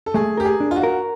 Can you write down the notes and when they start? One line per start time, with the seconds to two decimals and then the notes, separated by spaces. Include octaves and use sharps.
0.06 A4
0.14 A3 G#4
0.37 G4 A#4
0.45 G#4
0.60 D4
0.71 F4
0.76 F#4
0.83 A#4